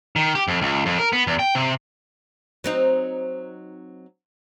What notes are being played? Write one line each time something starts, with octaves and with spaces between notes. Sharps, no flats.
D#3
G4
F2
C#2
F2
A#4
B3
E2
G5
C3
F#3 C4 D#4